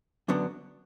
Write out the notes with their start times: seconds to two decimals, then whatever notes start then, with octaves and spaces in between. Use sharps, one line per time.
0.28 F#2 D3 F#3 B3 D4